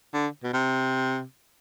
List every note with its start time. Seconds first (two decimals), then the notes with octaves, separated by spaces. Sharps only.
0.13 D3
0.43 B2
0.53 C3